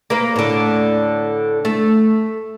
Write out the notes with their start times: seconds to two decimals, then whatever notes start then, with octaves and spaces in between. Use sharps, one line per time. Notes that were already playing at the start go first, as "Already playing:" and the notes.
0.10 A#3 B4 F5
0.36 A2 D3
1.65 A3